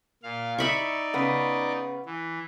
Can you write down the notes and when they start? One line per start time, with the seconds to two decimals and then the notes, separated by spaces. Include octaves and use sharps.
0.23 A#2 F5
0.58 D#4 D5 E5 B5 C#6
1.14 C#3 B3
2.06 E3